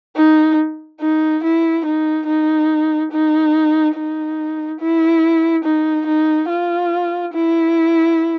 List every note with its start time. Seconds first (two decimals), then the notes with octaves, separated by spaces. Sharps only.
0.16 D#4
1.01 D#4
1.43 E4
1.85 D#4
2.26 D#4
3.11 D#4
3.95 D#4
4.80 E4
5.64 D#4
6.06 D#4
6.49 F4
7.33 E4